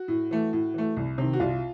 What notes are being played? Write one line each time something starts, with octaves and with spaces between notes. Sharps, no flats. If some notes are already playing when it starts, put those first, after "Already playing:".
Already playing: F#4
A2
E3 A3
A2
E3 A3
C2
C3 D#3
F#4
C2 F4